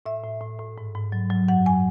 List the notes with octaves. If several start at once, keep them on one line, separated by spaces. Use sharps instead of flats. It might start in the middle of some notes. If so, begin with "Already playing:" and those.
A2 E5
A2
A2
A2
G#2
G#2
F#3
F#3
F#2 F#5
G#5